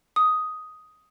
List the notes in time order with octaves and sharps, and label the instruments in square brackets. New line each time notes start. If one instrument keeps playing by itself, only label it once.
[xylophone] D#6